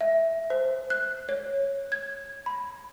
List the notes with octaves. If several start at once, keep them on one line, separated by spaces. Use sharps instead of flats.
E5
C5
F#6
C#5
G#6
B5